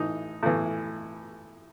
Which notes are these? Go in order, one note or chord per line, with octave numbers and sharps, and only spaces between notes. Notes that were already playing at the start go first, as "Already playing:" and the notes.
Already playing: A2 E3 D#4
A2 E3